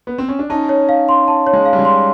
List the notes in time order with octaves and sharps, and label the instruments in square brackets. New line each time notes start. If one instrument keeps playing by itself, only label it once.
[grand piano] B3
C4
C#4
D4
[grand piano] C#4 D#4 [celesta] A5
[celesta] C#5
F5
C6
A5
C#5
[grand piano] G#3
[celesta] F5
[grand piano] G3
G#3
[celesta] C6